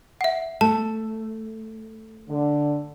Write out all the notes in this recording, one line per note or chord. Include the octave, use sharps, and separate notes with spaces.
E5 F#5
A3 A5
D3